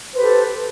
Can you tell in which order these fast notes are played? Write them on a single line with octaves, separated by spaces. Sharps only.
C5 B4 G4 A4